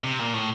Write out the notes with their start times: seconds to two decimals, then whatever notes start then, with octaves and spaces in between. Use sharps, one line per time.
0.04 C3
0.19 A#2
0.33 A2